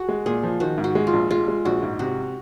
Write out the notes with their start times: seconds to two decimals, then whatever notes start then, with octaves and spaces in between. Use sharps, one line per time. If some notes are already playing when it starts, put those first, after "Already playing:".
Already playing: F#4 G#4
0.08 G#3
0.26 A#2 G#4
0.43 F3
0.60 D#3 F#4
0.78 G#2
0.84 F#4
0.95 G#3
1.07 F4
1.13 A#1
1.31 G#3 F4
1.48 G#3
1.65 A#1 F#4
1.83 G#2
1.99 C3 F#4